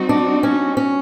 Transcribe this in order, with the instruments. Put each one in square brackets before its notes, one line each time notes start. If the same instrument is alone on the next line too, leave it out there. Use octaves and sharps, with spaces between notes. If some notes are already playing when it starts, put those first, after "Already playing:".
Already playing: [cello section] G3 C4 D#4 F#4
[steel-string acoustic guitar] D4
C#4
C#4